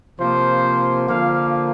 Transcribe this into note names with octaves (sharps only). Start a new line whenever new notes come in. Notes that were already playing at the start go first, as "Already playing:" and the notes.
C3 F3 A#3 C5
D3 F3 A#3 F5